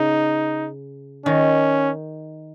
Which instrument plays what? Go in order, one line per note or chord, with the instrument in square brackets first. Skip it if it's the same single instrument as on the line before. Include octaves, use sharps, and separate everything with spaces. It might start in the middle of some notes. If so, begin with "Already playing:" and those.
Already playing: [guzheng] C#3 [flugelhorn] D#4
[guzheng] D#3 [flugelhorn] C#4